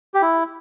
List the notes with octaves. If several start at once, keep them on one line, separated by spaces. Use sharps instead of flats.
G4
E4